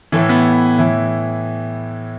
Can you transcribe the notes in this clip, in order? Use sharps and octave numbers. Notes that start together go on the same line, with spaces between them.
A2 E3 A3
B3
A2 E3